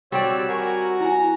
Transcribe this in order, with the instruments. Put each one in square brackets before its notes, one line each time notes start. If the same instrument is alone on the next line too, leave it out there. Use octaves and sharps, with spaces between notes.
[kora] G3 C4 D5 [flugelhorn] F#4 [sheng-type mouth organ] C#5 E6
[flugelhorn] F#4 [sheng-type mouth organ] A#4 G#5 [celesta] F#5 C#6
[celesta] E4 G#5 [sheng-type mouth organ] A#5